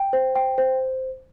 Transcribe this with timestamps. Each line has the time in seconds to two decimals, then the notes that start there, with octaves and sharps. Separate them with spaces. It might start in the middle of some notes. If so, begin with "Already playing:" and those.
Already playing: G5
0.13 C5
0.35 G5
0.58 C5